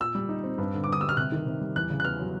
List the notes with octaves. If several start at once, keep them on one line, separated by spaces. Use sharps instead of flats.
A#2 E6
G3
D#4
C4
G2
D3
D6
G2 D#6
G3 E6
F6
C3 F#6
D#3
C3
G3
E2 F#6
C#3
F#6
B3 F6
F#3